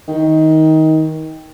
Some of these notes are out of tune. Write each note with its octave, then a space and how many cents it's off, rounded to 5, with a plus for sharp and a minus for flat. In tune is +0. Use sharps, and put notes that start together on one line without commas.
D#3 +20